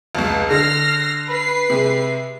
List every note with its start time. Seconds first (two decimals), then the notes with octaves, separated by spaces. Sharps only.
0.15 F1 C#2
0.51 D3 F6 A#6 C7
1.27 B4 C7
1.70 C3 G#3